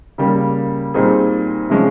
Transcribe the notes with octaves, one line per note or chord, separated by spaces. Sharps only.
C#3 G3 A#3
A#2 G3 C4 D#4 G#4
C3 F3 G#3 C#4